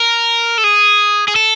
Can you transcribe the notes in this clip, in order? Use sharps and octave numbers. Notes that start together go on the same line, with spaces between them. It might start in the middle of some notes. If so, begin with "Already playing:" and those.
Already playing: A#4
A4
G#4
G#4
A4